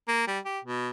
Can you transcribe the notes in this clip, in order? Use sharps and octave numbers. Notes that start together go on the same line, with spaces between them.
A#3
G3
G4
B2